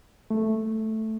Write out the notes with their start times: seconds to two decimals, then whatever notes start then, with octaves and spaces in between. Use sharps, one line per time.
0.30 A3